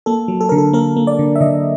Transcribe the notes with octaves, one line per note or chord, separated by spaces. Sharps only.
A#3 A4
F#3
A4
D3 A#4
A4
A#3 A#4
A#3
D5
D3
E5
D3 D#5